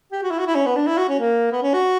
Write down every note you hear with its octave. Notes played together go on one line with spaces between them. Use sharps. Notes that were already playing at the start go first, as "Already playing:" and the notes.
G4
F#4
E4
F#4
E4
C#4
B3
D4
E4
F#4
C#4
A#3
B3
C#4
F#4